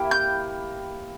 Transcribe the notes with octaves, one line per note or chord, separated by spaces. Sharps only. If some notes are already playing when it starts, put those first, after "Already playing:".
Already playing: A#3 E4 G4
G6